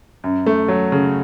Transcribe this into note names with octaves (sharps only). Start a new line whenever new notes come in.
F#2
A3
F#3
C#3